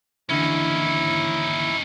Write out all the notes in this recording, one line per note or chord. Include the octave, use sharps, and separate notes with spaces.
D#2 D3 E3 C#4 D#4 E4